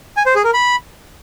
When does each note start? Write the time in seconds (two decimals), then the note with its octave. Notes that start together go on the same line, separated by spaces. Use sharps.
0.17 G#5
0.26 C5
0.35 G#4
0.44 A#4
0.54 B5